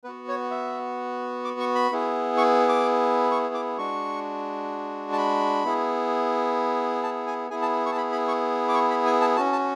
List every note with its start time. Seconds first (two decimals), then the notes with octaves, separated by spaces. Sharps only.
0.04 B3 F#4 B4
0.28 C#5
0.51 E5
1.44 D6
1.60 C#6
1.75 B5
1.92 B3 E4 G#4
2.38 C#6
2.69 D6
3.31 C#6
3.54 D6
3.78 G#3 D4 F#4 C#6
5.12 A5
5.18 B5
5.64 B3 E4 G#4
7.03 A5
7.27 G#5
7.50 B3 E4 G#4 G#5
7.62 A5
7.86 C#6
7.92 A5
7.97 B5
8.12 B5
8.28 C#6
8.68 D6
8.74 C#6
8.90 B5
9.06 G#5
9.21 A5
9.36 C#4 F#4 A5
9.52 A5